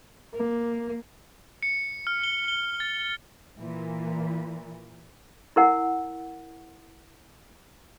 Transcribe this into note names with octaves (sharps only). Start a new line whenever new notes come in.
A#3
C#7
F6
G7
G7
A6
A#2 E3
E4 A#4 F#5